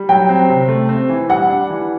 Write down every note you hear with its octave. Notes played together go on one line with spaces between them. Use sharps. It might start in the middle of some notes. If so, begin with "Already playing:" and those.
Already playing: G3
F#3 G5
C4
C3
A3
C4
E3
G3 F#5
D4
E3